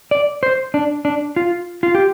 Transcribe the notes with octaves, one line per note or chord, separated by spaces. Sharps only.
D5
C5
D4
D4
F4
F4
G4